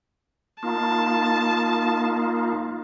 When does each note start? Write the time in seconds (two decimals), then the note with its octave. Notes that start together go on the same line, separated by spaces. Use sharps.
0.63 A#3 D#4 F4 A5